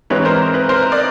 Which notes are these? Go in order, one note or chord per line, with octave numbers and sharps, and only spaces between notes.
G#2 E3 G#3 C4 B4 C#5
A#4 C5
B4
A#4 C5
D5